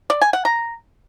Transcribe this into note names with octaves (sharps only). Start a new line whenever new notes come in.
D5
G#5
F#5
A#5